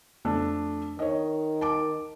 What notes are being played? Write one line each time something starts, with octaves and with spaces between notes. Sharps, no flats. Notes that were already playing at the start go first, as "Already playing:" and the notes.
F2 A3 D4
D#3 C#5 D#5
A5 D6